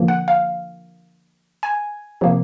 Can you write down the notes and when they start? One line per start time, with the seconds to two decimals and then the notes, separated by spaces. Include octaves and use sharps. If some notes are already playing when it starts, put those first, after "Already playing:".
Already playing: D3 F3 A#3
0.08 F#5
0.28 F5
1.63 G#5
2.21 C3 F3 A#3